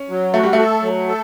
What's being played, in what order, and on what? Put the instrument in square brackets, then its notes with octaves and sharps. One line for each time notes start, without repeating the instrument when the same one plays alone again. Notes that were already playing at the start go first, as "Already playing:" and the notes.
Already playing: [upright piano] C#4
[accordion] F#3
[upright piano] A3 [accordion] F#4
[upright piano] G3
A3
[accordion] A4
F#3
A4